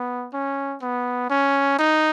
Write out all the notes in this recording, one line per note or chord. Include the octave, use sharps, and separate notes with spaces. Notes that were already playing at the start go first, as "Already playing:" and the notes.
Already playing: B3
C#4
B3
C#4
D#4